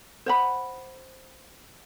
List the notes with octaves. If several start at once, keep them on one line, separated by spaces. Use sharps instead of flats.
C5 F#5 B5